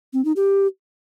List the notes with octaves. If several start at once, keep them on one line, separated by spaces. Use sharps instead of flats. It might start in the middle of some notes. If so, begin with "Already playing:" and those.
C4
D#4
G4